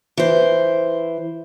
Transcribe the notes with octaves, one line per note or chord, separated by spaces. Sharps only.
E3 C5